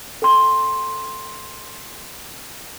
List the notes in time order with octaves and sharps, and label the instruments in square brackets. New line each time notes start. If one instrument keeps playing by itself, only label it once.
[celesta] A4 G5 C6